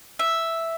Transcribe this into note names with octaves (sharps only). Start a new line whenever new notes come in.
E5